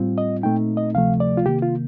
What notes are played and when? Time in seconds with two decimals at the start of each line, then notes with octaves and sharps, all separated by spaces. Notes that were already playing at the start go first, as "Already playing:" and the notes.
Already playing: A2 G3 C4 F4
0.18 D#5
0.43 A#2 A3 C4 D#4 G5
0.77 D#5
0.94 D2 C3 F3 A3 F5
1.20 D5
1.37 F4
1.45 C3 D#3 A#3 G4
1.62 F4